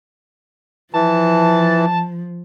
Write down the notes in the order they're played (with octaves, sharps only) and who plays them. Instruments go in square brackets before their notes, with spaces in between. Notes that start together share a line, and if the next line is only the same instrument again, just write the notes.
[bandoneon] E3 [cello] F3 [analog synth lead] A5